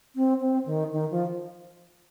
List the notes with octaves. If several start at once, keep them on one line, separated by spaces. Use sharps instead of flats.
C4
C4
D#3
D#3
F3